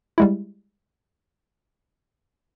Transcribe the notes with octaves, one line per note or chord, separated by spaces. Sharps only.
G3 G#3 E4